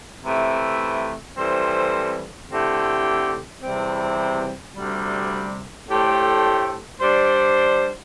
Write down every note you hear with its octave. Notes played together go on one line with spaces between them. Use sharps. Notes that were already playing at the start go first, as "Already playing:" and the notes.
C3 E3 A3
E3 G3 C4 A4 C5
D3 A3 C4 E4 G4
E2 C3 E3 G3 C4
D2 C3 G3
A2 A3 D4 G4 C5
G3 D4 C5